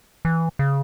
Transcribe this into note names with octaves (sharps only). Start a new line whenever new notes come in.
E3
C#3